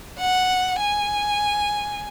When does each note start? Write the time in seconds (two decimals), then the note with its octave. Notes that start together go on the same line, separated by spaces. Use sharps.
0.19 F#5
0.79 G#5